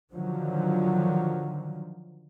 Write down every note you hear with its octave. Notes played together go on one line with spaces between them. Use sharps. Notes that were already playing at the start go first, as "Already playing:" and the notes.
D3 D#3 F3 F#3